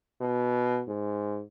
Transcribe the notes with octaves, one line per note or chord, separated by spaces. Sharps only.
B2
G#2